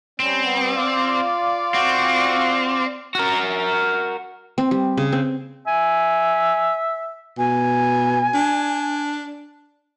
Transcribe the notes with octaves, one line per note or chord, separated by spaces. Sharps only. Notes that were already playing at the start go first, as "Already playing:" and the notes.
G3 C4 C#4
G3 B3
F4 D5 F5
C4 F#4
F#4 A#4
C4
G3
C#3
C4
E5 G#5
B2 G#5
D4